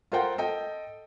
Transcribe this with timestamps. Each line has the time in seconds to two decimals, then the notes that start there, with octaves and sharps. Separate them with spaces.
0.12 F4 A4 A#4 C5 F#5 G5
0.38 A4 D#5 G5